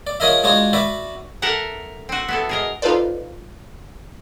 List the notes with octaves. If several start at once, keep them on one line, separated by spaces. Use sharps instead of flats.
D5
F3 C#4 G#4 A#4 D#5 E5
G#3 D4 F4 F#4 G#4
F#4 B4 D5 E5
A4 A#4 E5 F#5 A#5
C4 F#4
B3 E4 A4
G#4 A#4 D#5
D#4 F4 A4 B4 C5 D5